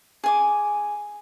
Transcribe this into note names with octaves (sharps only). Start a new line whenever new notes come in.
G#4 G#5 D6